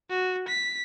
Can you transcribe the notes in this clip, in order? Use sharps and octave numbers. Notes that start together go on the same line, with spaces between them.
F#4
B6